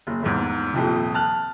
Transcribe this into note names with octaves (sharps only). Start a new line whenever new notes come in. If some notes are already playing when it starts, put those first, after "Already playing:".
F#1
F1 E2 G#2
D#1 F2 C3
A5 F6 F#6